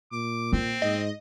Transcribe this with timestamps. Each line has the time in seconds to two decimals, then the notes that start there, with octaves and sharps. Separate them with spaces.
0.12 A#2 D6
0.53 A#3 C4
0.82 G#2 D#5